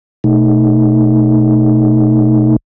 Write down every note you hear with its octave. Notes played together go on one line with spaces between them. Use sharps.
B2 A3 D#4